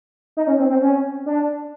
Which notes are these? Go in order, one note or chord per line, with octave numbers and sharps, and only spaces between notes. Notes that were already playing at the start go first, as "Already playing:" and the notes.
D#4
C#4
C4
C4
C#4
D4